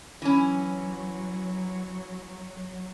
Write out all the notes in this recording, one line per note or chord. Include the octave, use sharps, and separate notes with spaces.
E3 F#3 C#4